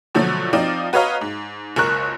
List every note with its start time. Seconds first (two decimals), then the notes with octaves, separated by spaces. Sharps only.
0.15 B2 D3 F3 F#3 A3
0.53 F3 C4 D#4 F4 D5
0.93 F#4 B4 C#5 D#5 F5 A#5
1.21 G#2
1.76 F#1 C#2 A#4 C#6 F#6